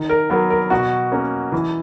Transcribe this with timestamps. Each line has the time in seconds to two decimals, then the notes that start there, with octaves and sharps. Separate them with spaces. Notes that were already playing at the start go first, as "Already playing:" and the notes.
Already playing: D#3
0.09 A#4
0.30 F#3 B3 A#4
0.50 A#4
0.70 B2 F#4
1.12 A#3 C#4
1.52 E3